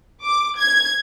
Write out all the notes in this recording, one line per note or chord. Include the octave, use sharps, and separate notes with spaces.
D6
G#6